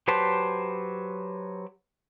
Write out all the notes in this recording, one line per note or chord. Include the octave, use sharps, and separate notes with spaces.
F#3 G4 B4 C5 A5